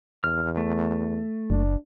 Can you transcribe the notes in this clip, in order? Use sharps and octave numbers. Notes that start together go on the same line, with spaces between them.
E2 F6
A3
F#1 D4